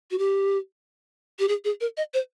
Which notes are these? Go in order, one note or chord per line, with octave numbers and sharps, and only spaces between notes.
F#4
G4
G4
G#4
G#4
A#4
D#5
C5